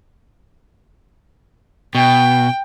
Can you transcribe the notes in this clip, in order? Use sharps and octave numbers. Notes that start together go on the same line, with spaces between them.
B2 G5